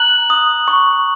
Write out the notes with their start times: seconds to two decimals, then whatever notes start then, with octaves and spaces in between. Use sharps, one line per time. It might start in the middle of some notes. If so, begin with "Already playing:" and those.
Already playing: A#5 F#6 F#7
0.30 D#6
0.68 C#6